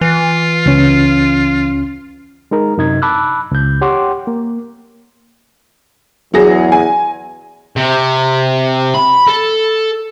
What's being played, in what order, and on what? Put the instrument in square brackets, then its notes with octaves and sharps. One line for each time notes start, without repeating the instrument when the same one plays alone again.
[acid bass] E3 [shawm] F4
[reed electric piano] C#2 C#4
G#3 D#4 A#4
F#2 C3 D#4 D#5 G#6
A5 B5 D6 E6 F#6
C#2 G6
G4 C#5 F#5 G5 C6 D6
A#3
[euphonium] E2 [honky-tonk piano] F#3 G#4 A#6
[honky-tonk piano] G#5
[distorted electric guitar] C3
B5
A4